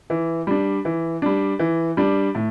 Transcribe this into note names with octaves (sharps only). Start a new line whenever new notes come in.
E3
G3 D4
E3
G3 D4
E3
G3 D4
A2